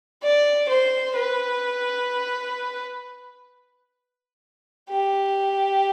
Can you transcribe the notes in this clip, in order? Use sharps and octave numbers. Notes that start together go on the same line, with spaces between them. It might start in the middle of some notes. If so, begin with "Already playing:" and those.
D5
C5
B4
G4